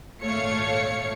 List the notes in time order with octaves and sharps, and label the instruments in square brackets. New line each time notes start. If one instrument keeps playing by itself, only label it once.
[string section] G#1 A#2 A3 C#5 F5 C#7